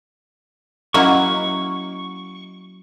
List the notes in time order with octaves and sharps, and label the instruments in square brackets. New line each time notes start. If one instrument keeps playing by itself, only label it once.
[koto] F#3 A#3 E4 [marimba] C#4 D#5 F#5 [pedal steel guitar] C#6